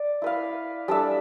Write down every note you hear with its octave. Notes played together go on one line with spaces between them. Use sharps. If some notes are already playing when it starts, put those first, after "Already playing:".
Already playing: D5
E4 B4 F5
G3 D4 A4 E5